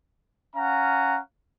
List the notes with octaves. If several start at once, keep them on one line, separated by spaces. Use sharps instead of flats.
C#4 F5 F#5 A#5